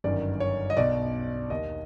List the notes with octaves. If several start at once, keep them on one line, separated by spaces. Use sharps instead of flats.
G1 F#2 D#3 D5
C#5
D#5
B1 B2 D5
D#2 D#3 D#5